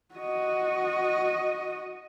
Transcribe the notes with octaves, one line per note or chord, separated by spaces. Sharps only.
F#4 D#5